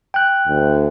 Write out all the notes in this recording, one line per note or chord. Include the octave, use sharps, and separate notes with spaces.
G5 F#6
D2